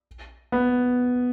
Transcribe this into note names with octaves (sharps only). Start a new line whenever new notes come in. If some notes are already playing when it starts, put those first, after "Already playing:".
B3